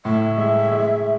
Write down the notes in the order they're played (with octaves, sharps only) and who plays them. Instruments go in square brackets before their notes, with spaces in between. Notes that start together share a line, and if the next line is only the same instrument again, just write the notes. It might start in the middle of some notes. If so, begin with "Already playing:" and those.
[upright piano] A2 [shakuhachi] E5
[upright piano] G#3
G#3